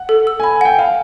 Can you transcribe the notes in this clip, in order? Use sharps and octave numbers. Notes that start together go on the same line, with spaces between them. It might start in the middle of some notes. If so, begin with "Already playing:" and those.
Already playing: F#5
A4
E6
G#5
B5
F#5 G5
F5 G#5